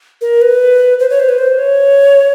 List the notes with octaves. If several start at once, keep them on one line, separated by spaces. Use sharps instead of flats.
A#4
B4
C5
C#5
C5
B4
C5
C#5